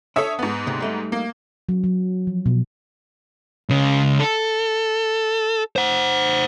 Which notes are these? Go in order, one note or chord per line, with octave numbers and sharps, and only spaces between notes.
D4 A4 C#5 E5 D#6
G#2 B3
D2 C3
G3 A3 D#4
A#3
F#3
F#3
F3
B2
C#2 C#3
A4
C5 F#5